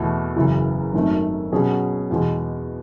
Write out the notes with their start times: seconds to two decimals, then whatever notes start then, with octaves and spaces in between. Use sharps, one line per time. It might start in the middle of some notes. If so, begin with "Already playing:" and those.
Already playing: E2 B2 A3
0.36 F#1 F#2 C#3 E3
0.93 G#1 F#2 D#3 A3
1.52 B2 F#3 C#4 G#4
2.10 E2 B2 G#3